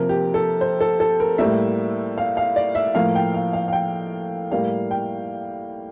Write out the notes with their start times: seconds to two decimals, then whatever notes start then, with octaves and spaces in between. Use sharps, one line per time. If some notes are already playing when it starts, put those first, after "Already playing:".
Already playing: C3 F3 A#3 A#4
0.09 G4
0.34 A4
0.61 C5
0.80 A4
1.00 A4
1.20 A#4
1.38 A2 G3 A#3 E5
2.18 F5
2.37 F5
2.56 D5
2.75 E5
2.95 A2 F3 A#3 F5
3.15 G5
3.34 F5
3.53 F5
3.68 F5
3.73 G5
4.52 A2 G3 A#3 F5
4.91 G5